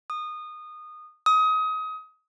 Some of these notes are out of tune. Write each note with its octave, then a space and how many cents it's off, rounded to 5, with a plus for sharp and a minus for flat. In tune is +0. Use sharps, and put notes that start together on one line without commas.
D#6 -20
D#6 +25